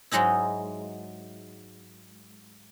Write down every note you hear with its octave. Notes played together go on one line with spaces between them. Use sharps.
G#2 F#3 G#3 D#4 E4